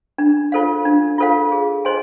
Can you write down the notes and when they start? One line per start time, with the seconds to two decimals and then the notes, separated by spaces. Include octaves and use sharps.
0.18 D4
0.52 F4 A4 C5 F5
0.85 D4
1.18 F4 A4 C5 F5
1.52 G#4
1.85 C5 D#5 G#5 C6